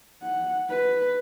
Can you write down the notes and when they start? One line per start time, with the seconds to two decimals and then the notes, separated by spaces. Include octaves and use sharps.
0.23 F#5
0.70 B4